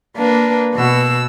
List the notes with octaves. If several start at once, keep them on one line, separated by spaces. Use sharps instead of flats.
A#3 D4 B4
B2 F#4 E6